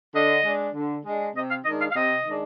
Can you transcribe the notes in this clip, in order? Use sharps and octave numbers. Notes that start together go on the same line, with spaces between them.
D3 D#5
G#3 D4
D3
G#3 D4
C3 D#5
F5
D#3 G#3 D4 D#5
F5
F5
C3 D#5
D#3 G#3 D4